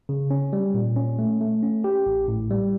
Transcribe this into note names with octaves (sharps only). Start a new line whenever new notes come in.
C#3
C#4
G3
A#2
C#4
A3
A3
C#4
G4
A1
A2
G3